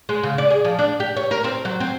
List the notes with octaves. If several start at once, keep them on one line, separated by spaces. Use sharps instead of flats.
G#3
C#3
D5
G#4
F3
D4
G4
C#5
A#4
C4
F#3
C4